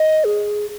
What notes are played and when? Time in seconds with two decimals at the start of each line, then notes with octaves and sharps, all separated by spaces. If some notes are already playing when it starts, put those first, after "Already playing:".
Already playing: D#5
0.24 G#4